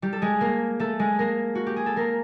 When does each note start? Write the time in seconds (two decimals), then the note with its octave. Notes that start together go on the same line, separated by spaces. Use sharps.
0.02 G3 G4
0.13 A4
0.22 G#3 G#4
0.41 A#3 A#4
0.80 A3 A4
0.99 G#3 G#4
1.19 A#3 A#4
1.55 F#4
1.66 G4
1.76 G#4
1.86 A4
1.96 A#3 A#4